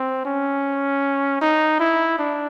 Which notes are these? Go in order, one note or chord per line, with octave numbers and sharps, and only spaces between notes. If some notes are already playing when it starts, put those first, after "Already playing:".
Already playing: C4
C#4
D#4
E4
D4